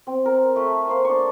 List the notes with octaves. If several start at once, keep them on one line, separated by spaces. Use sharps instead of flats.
C4
A#4
A3 E5
A#3 C5 D#6
D4 C#6